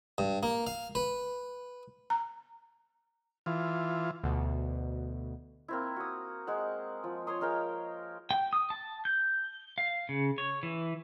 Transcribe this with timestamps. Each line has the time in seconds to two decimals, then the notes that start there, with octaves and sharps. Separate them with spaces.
0.18 G2
0.43 A#3
0.67 F5
0.95 B4
2.10 A#5
3.46 E3 F4
4.24 D2 B2
5.68 A#3 C4 E4
5.96 F#4 D#6
6.47 G#3 C5 F#5
7.04 F3
7.27 C#5 G#5 C6 D#6
7.41 G#3 A#4 F5 G5
8.31 G5
8.53 D#6
8.70 A5
9.05 G6
9.78 F5
10.09 C#3
10.38 C#5
10.63 E3